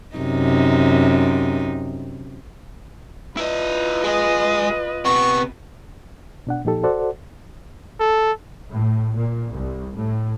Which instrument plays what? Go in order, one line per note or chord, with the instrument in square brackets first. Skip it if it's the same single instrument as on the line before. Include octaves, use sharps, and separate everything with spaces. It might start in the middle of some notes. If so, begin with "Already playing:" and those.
[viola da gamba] F#2 C3 D#4
[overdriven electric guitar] E4 D#5 [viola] F4 B4
[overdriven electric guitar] G#3 G#4 [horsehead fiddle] D#5
[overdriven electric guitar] C3 B3 [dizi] C#6
[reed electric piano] B2 D4 F#5
A#2 F3 D#4 G4 A4
F#4 A4 C5 D5 F#5
[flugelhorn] A4
[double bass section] A2
A#2
C2
A2